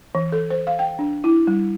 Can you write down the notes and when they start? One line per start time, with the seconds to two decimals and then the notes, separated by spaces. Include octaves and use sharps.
0.15 E3
0.32 A4
0.50 C5
0.67 F5
0.79 G5
0.99 D4
1.24 E4
1.47 G3